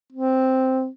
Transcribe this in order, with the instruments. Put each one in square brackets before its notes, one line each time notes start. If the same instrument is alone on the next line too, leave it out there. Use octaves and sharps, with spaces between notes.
[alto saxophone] C4